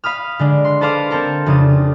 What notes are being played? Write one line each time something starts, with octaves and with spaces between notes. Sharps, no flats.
F5 B5 D#6 F6
D3 G#3 D4
C6
A4 B4 C5 F5 C6 D6
C4 A4 A#4
F1 C#3 D4 F4 D#6